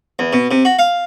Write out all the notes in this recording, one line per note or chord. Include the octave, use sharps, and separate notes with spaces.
E2
B2
C3
F#4
F5